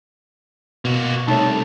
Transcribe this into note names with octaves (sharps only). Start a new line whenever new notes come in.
B2 A#3 F#4
C2 A3 D#4 C#5 A5